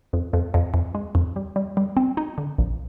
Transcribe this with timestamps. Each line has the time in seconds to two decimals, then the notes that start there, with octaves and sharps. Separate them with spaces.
0.13 F2
0.33 F2
0.54 F2
0.74 F2
0.95 G#3
1.15 F2
1.36 G3
1.56 G3
1.77 G3
1.97 C4
2.17 D#4
2.38 D3
2.58 A#1